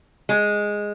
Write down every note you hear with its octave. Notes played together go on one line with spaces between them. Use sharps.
G#3